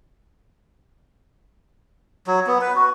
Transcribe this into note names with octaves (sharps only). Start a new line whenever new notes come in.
F#3
B3
B4
F#4